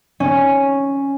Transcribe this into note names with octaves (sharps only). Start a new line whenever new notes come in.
C#4